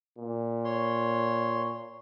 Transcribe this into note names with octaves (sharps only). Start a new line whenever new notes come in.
A#2
C#5 C6